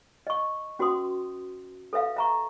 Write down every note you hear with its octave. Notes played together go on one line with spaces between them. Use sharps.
D#5 C#6
C#4 F#4 B4 C6 D#6
A4 B4 E5 F5
E5 A#5 C#6